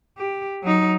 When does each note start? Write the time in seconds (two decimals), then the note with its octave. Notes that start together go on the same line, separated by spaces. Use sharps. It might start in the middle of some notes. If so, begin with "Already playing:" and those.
0.18 G4
0.63 F#3 D#4